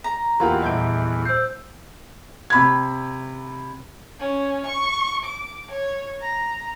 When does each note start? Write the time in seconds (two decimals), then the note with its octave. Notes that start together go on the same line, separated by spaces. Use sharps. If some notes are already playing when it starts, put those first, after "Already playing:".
0.04 A#5
0.40 E2 A#3 F4 G4 F#5 C6
0.62 D#1 D#5 E5 G6 D7
1.25 C5 E6 G6 C7
2.50 C3 B5 G#6
4.19 C#4
4.66 C#6
5.24 D6
5.71 C#5
6.21 A#5